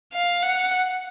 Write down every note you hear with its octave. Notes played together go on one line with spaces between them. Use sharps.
F5
F#5